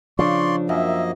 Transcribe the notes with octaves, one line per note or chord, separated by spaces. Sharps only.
C#3 F3 D4 D5 C6 C#6
F#2 A#3 D#5 E5